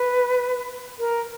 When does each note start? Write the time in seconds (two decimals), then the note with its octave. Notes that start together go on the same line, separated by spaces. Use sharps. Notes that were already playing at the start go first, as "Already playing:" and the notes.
Already playing: B4
0.99 A#4